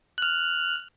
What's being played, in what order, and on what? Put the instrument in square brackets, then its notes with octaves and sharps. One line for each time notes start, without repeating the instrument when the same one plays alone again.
[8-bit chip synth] F6 F#6